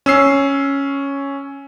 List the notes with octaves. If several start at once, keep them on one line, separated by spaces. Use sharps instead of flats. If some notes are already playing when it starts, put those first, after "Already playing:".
C#4 E6 C7